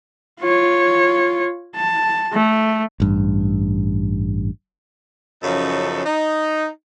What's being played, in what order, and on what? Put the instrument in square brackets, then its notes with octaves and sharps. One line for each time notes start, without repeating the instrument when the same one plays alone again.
[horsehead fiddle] F4 C#5
A5
A3
[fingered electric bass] A1 G2
[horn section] F#2 C#3 F3 D#4 A4
D#4